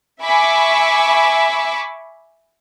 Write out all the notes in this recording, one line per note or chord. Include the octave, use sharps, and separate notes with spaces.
E5 G#5 B5 C#6 D6 E6